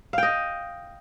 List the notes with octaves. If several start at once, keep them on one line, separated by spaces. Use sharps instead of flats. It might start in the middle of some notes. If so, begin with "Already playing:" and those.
D#5 F5 G5